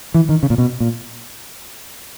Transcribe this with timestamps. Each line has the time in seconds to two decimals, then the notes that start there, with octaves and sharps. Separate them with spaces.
0.14 E3
0.29 D#3
0.43 C#3
0.50 A#2
0.58 B2
0.80 A#2